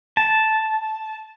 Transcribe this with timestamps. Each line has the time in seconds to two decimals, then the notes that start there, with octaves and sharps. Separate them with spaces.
0.17 A5